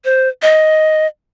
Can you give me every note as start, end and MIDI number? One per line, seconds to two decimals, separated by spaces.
0.05 0.29 72
0.42 1.07 75